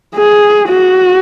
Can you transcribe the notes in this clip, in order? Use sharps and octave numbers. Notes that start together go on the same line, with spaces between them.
G#4
F#4